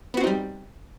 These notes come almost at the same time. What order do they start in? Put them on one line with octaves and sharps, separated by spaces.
B3 F#4 C4 D#4 G3